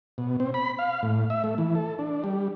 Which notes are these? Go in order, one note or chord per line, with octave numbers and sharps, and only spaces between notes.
B2
C4
B5
F5
A2
E5
A3
E3
A4
D4
G3